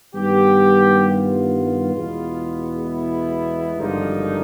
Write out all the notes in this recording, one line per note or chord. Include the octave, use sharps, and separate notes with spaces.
G2 D#3 G3 B3 G4
F4
E2 B2 G#3 B3
E4
G#1 G2 D3 F3 A#3 D#4